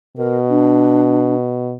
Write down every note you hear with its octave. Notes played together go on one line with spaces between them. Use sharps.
B2 A#4
D4